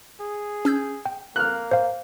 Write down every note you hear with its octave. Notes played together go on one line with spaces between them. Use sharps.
G#4
C#4 E6 G6
G5
A#3 F6 F#6
C5 F5